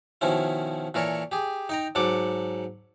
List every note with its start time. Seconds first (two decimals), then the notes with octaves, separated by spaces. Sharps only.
0.21 B2 D#3 F3 C#4 E4
0.94 A#2 E3 A4 A#4 C#5
1.32 G4 G#4
1.69 D#4 G5 A#5
1.95 G#2 F#3 A4 F#5 D6